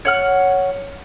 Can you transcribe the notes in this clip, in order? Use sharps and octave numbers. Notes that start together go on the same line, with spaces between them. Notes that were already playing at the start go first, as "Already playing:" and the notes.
C#5 F#5 F6